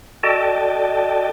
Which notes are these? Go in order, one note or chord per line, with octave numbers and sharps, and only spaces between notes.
F#4 A4 D5 D#5 G5 A5